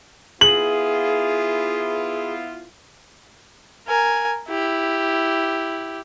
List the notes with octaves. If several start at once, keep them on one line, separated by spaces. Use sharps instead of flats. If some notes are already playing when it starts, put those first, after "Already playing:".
B3 E4 F4 G#4 F#7
A#4 G#5
E4 G4